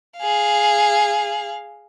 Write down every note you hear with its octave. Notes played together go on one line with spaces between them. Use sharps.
G#4 F5